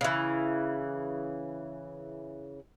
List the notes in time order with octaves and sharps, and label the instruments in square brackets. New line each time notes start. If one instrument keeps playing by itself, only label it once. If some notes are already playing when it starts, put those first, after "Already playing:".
[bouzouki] C#3 E3